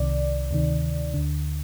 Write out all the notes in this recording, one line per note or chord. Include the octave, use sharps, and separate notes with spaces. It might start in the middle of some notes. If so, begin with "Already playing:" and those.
Already playing: C2 C3 D#3 D5
D2 C3 D#3
D2 D3